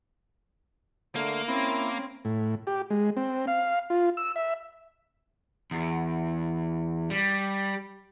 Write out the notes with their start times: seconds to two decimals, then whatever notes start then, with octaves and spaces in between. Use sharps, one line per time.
1.15 D3 A3 A#3 F6
1.48 C4 C#4 E4
2.25 A2
2.67 G4
2.90 G#3
3.17 C4
3.47 F5
3.90 F4
4.17 E6
4.36 E5
5.71 E2
7.10 G3